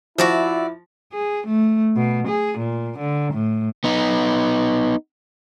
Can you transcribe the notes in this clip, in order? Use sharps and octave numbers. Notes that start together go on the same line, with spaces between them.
F3 E4 F#4 D5 E5
G#4
A3
B2
G#4
A#2
D3
A2
B3 D#4